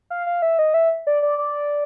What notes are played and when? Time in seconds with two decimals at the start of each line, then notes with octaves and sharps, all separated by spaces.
0.10 F5
0.27 F5
0.42 E5
0.59 D#5
0.74 E5
1.07 D5
1.22 D5
1.38 D5